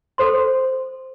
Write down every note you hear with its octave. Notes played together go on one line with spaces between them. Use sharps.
A4 C5 C6